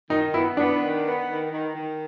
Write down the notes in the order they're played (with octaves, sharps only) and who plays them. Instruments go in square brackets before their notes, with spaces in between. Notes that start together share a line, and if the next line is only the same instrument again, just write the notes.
[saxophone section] D#3 [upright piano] D#4
[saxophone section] B3 [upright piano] E4
[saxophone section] B3 [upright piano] D4
[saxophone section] D#3
B3
D#3
D#3
D#3